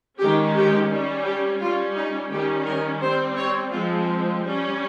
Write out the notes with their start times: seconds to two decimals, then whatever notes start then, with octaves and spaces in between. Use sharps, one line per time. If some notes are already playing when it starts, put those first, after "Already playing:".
0.19 D#3 G#3 C#4 G4
0.55 G4
0.89 G3 C#4
1.24 G4
1.60 G3 C#4 F4
1.95 D#4
2.30 D#3 G3 C#4 G4
2.65 A#4
3.00 G3 C4 C5
3.36 C#5
3.71 F3 G#3 C4 F4
4.42 G3 C#4